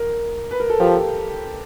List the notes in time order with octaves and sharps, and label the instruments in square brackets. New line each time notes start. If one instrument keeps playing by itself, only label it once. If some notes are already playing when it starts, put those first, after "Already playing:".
Already playing: [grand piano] A#4
B4
A#4
A4
[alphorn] F3 [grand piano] G4